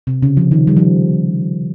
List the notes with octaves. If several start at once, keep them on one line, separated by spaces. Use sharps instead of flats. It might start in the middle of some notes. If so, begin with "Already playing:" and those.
C3
C#3
F3
D#3
G3
F3